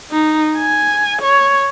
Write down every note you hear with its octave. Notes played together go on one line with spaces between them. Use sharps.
D#4
G#5
C#5